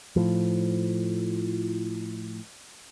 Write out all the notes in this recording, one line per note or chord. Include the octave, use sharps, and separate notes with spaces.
A2 F3